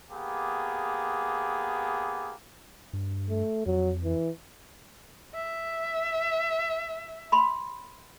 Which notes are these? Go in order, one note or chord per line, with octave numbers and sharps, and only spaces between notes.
A#3 B3 G4 G#4
G2
A3
F2 F#3
E3
E5
B5 C6